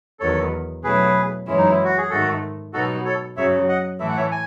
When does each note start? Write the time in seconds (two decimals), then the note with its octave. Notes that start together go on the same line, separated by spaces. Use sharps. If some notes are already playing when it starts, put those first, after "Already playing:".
0.20 E2 D#3 F#3 B3 A4 C#5
0.83 B2 F#3 A3 C#4 E4 G#4 B4
1.47 F#2 E3 G#3 C#4 E4
1.58 D#4
1.71 E4
1.84 F#4
1.98 G#4
2.10 G#2 D#3 A3 F#4 A4
2.73 B2 F#3 B3 D#4 F#4 A4
3.05 A4 C#5
3.37 F#2 C#3 F#3 C#4 C#5 E5
3.68 D#5 F#5
4.00 A2 E3 A3 E4 E5
4.08 F#5
4.17 C#5 E5
4.31 G#5